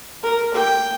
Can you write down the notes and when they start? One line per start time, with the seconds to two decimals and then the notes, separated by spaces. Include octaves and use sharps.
0.23 A#4
0.54 G5